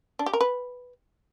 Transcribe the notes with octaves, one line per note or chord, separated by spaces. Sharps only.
D4
G4
A#4
B4